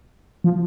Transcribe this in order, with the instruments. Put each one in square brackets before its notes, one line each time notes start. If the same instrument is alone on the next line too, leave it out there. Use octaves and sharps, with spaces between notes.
[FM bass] F3